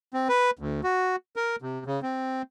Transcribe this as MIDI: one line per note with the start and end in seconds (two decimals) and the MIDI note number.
0.14 0.28 60
0.29 0.51 71
0.59 0.81 38
0.84 1.16 66
1.36 1.56 70
1.62 1.84 48
1.86 2.00 49
2.03 2.42 60